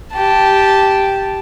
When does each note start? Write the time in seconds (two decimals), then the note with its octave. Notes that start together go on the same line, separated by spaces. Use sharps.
0.14 G4 A5